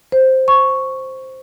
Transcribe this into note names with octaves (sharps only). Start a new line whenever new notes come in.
C5
C#6